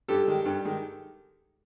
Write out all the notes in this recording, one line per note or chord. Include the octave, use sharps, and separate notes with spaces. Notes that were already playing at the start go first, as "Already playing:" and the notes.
G2 G4 A4
D#3 G#3
G2
D#3 G#3